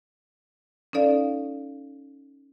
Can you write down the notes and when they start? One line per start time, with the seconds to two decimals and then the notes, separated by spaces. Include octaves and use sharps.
0.93 C#4 D#4 A4 D5 F5